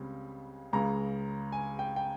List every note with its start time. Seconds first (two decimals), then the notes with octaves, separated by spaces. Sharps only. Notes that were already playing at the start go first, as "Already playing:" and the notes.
Already playing: C#2 C#3 G3 C4
0.73 C#2 C#3 G#3 A#5
1.52 G#5
1.79 G5
1.96 G5